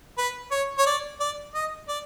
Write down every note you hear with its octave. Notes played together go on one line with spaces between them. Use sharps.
B4
C#5
C#5
D5
D5
D#5
D5